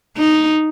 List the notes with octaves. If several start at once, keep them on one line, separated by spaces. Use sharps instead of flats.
D#4